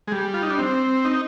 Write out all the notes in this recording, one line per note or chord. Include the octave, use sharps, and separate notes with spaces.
G#3
G3
F4
D#4
D4
C4
D#4